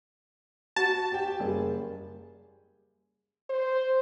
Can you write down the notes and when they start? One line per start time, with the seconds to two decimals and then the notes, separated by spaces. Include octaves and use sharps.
0.76 F#4 A5
1.12 G4 G5
1.40 F#1 G3 G#4
3.50 C5